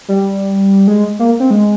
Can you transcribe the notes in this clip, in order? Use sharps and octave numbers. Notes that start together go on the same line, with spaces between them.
G3
G#3
A#3
C4
G#3